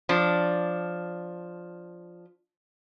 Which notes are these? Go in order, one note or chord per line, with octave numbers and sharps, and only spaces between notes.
F3 D4